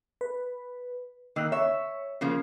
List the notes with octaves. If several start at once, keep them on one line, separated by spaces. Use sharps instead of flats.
B4
D#3 A#3 D#5 E6 F#6
C#5 E5 C#6
C#3 F3 A#3